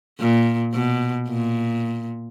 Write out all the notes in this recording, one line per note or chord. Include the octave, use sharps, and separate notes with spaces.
A#2
B2
A#2